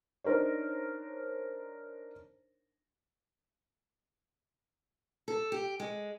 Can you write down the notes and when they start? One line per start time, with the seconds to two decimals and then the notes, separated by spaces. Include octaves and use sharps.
0.24 D4 D#4 A#4 C5 C#5
5.28 A4
5.52 G4
5.80 G#3